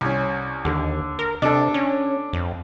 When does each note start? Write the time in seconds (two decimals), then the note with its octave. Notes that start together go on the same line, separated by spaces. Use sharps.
0.01 C2 C#4
0.65 D#2 D3
1.19 A#4
1.42 C3 D4 A4
1.74 C#4
2.33 F2